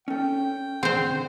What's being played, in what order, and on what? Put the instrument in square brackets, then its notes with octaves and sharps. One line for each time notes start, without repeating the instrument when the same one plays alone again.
[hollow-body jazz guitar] C#4 A4 [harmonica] G5
[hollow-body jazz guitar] D3 G#4 F#5 [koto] C4 C5